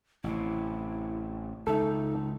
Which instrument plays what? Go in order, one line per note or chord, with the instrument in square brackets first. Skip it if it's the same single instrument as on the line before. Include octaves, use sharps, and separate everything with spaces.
[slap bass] A1 C3 [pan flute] E4
[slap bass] C#2 [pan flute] D#4 [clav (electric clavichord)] A4 E5